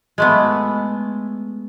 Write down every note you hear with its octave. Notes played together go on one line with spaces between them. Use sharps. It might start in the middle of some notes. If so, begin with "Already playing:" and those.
G#3 A3 B3